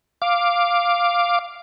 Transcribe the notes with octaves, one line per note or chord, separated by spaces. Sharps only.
F5 D6